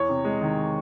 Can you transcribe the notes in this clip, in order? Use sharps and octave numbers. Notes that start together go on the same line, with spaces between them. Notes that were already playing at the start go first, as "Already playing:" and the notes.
Already playing: E2 C#5
C3
G#3
D#3